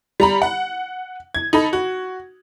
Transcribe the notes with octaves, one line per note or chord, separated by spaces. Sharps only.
G3 A#5 B5
F#5
G#6
D#4 A4 B5
F#4